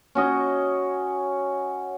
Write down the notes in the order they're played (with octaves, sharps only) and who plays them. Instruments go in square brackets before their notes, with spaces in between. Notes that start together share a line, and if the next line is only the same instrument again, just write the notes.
[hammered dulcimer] C#4 F#4 D#5